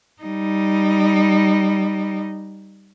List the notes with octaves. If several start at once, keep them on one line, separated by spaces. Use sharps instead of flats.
G3 D#4